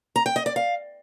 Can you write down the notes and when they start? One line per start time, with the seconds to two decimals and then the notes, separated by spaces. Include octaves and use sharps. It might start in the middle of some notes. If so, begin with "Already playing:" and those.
0.16 A#5
0.26 G5
0.36 D#5
0.46 D5
0.56 F5